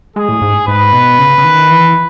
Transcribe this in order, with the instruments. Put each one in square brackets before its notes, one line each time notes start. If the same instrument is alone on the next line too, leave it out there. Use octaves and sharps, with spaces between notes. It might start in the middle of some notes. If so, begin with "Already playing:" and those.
[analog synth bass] G#3 [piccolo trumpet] G#4
[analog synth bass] A2
G#2
[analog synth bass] G#2 [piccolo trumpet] B4
[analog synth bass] B2
C#3
C#3
D#3
E3